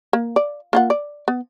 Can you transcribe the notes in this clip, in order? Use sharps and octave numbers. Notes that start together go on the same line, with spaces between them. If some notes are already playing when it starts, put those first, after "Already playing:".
A#3
D5
A#3 F4 F#5
D5
B3